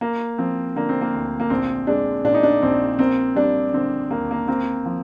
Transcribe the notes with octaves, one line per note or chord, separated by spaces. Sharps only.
A#3
F3 C4
D3 A#3
C4
A#3
D2
A#3
A#1 C4
G#3 D4
A#2 D4
D#4
D4
A#1 C4
A#3 C4
G3 D4
D3 C4
D#2 A#3
A#3
A#3 C4
F3